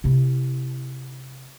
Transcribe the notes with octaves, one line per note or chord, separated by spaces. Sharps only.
C3 E4